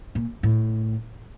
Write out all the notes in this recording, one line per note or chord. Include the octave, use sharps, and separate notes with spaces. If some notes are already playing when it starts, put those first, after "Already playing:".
A#2
A2